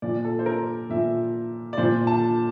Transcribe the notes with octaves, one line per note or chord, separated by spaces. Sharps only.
A#2 F3 D5
A4
C5
A#4
A#2 F3 E5
D5
A#2 F3 C5
A5